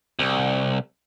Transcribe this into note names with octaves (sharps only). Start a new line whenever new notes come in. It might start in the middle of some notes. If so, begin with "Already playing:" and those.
C2